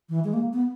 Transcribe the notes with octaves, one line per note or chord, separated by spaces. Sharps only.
E3
G#3
A#3
B3